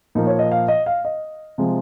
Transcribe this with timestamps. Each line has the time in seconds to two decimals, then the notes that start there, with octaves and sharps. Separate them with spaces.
0.15 A#2 F3 A#3 D#4
0.27 C#5
0.39 D#5
0.52 F5
0.68 D#5
0.86 F5
1.05 D#5
1.58 C3 F3 G#3